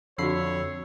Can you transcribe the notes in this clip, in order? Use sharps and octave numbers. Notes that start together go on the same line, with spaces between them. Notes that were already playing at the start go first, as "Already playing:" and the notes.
F2 D3 F#4 C#5 B5 E6 C7